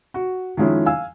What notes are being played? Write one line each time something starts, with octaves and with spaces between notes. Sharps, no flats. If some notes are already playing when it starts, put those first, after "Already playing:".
F#4
D#3 F3 G#3 C#4 E4
F5 G#5 E6